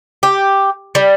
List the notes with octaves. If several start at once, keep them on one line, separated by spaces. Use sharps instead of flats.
G4
G3